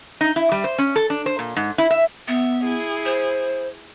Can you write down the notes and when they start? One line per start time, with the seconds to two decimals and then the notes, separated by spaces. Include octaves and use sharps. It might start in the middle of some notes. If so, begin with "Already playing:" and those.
0.21 D#4
0.36 E4
0.52 G3
0.64 C5
0.78 C#4
0.96 A4
1.10 D4
1.26 C5
1.39 A#2
1.56 G#2
1.78 E4
1.91 E5
2.28 B3 E5
2.64 E4 G#4
3.06 C5